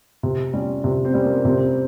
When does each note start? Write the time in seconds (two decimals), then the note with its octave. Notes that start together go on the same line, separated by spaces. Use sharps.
0.23 C3
0.54 G3 C#4
0.84 C3
1.05 C4
1.14 G3 C#4
1.25 A#3
1.45 C3 C4